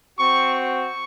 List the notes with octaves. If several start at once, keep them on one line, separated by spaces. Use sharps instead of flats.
C4 F#4 C#6
C#6